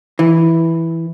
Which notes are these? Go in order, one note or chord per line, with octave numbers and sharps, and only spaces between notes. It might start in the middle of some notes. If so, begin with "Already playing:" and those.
E3